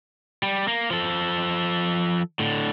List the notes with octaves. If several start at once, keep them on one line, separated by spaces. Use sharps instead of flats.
G3
A#3
F3 A4
A2 D3